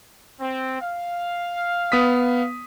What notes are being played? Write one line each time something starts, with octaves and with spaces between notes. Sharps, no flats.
C4
F5
B3 D#6 B6